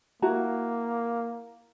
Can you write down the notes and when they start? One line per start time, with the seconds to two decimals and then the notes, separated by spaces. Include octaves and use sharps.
0.22 A#3 E4 F#4 A#5